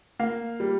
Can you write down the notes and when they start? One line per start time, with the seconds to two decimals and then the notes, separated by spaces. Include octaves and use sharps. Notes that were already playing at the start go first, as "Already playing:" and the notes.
0.19 A#3 F5
0.60 G3